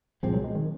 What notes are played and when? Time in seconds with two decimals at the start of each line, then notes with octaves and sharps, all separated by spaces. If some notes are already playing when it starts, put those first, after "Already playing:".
0.23 C2 A#2 F3 G#3 C4
0.34 F#3
0.44 G#3
0.55 D#3